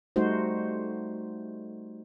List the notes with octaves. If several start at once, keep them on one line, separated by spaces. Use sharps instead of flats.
G3 A3 D#4 F#4 C5